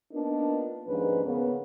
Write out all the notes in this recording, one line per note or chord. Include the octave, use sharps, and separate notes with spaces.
A#3 B3 D4 D#4 F4 A#4
D#2 G#2 F3 C#4 D4 B4
C#3 A#3 B3